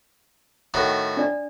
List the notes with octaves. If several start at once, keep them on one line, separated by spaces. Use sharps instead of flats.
A2 D#3 F#4
D4 D5